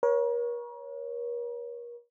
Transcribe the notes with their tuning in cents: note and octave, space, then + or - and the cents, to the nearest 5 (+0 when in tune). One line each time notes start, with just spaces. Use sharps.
A#4 +40 C#5 +0